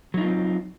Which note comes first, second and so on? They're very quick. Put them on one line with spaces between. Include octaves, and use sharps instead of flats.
F#3 D#4 F4 A#3 C4